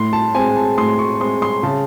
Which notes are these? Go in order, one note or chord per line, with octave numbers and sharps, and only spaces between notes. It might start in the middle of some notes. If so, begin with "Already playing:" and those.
Already playing: A2 C6
A5
G#3 C4 G#5
A5
A2 C6
C#6
G#3 C4 C6
C6
C#3 A5